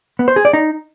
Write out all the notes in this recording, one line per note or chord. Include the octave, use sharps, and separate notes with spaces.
B3
C5
G#4
D5
D#4